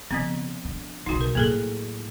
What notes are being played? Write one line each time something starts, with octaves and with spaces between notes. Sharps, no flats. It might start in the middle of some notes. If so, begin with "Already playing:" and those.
C#3 F3 B3 C4
D3
B1 C#3 D#4 F#4
A#4
A2 F#3 A#3 G#4 A4